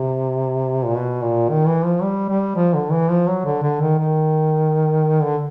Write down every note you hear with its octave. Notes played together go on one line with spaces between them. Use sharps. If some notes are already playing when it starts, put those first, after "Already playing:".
Already playing: C3
A#2
B2
A#2
D#3
E3
F3
G3
G3
F3
D3
E3
F3
F#3
D3
D3
D#3
D#3
D3